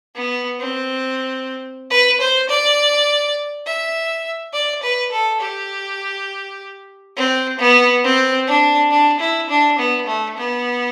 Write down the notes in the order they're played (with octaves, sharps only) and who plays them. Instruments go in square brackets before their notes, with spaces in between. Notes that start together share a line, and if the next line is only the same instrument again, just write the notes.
[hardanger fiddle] B3
C4
B4
C5
D5
E5
D5
B4
A4
G4
C4
B3
C4
D4
D4
E4
D4
B3
A3
B3